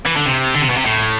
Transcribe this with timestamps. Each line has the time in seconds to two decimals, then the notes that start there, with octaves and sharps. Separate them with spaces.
0.06 E3
0.16 D3
0.26 C3
0.55 D3
0.62 C3
0.69 B2
0.77 C3
0.85 A2